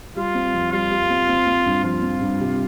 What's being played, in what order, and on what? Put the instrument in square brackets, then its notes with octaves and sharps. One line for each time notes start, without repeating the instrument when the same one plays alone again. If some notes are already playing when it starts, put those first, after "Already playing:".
[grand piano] G3 [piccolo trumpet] F4
[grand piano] C4
F2
[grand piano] G3 [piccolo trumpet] F4
[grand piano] G3
C4
C4
C4
G2
[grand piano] F3 [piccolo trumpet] F4
[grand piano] C4
G2
C3